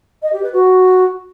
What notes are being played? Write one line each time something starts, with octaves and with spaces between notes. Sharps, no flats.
D#5
G4
B4
F#4